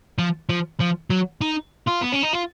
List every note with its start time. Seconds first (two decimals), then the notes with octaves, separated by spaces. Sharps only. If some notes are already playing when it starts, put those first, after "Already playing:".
0.19 F3
0.49 F3
0.80 F3
1.10 F#3
1.41 D#4
1.87 F4
2.01 B3
2.12 C#4
2.22 D#4
2.33 F4